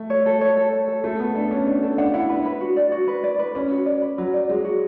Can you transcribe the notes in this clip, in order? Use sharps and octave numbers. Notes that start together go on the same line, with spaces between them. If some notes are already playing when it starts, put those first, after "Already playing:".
Already playing: A3
C#5
A4
C#5
A4
C#5
A4
A3 A4
B3 A4
D4 A4
C#4 C#5
D4 A4
D4 A4
D4 F#5
E4 F#5
D4 B4
B4
F#4
D5
F#4
B4
D5
B4
C#4 B4
F#4
D5
B4
F#3 B4
D5
G#3 D5
F#4